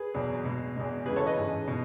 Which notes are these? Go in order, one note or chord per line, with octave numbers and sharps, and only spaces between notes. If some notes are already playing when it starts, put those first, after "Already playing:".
Already playing: G#4 B4
E2 B2 F#3
B2 G#3
E2 B2 G#3
F#2 C#3 E3 G#3 G#4 B4
A4 C#5
B4 D#5
G#2 E3 G#3
B2